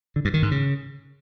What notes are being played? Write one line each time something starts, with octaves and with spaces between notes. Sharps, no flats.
D3
G2
D#3
G#2
C#3